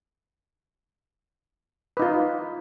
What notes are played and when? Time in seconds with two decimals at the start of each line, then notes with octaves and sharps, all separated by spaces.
1.97 B4
1.99 D#4
2.02 F4